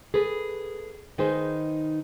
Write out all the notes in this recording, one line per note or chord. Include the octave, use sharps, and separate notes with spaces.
G#4 A4 B4
D#3 D#4 G#4 B4 C5